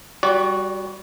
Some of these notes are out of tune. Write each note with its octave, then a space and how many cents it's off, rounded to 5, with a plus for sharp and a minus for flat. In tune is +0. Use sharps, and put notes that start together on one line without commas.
G3 +5 F#4 +0 D5 -40